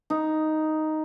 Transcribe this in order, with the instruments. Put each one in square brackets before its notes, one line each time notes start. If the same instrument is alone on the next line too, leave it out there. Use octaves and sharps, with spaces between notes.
[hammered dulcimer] D#4